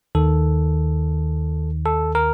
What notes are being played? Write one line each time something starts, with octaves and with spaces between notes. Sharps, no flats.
D#2 D#3 A4
A4
A#4